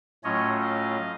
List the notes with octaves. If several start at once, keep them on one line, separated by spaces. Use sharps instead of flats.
A2 F#3 A3 C#4 F4 C#5 D#5
D#5 F5